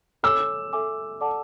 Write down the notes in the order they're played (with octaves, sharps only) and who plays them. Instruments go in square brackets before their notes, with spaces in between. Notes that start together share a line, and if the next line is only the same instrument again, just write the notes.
[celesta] A4 C#5 G#5 D6 [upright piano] E6
[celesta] A4 E5 G#5 D6
A4 D5 F#5 A5 D6